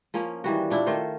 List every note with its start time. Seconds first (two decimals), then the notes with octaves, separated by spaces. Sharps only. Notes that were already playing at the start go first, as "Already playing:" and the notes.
0.14 F3 A#3 C#4
0.44 D#3 E3 G3 F#4
0.70 A#2 D4 E4
0.86 D#3 A3 F4 C5